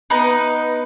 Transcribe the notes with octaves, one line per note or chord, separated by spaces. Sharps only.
B3 D#4 B4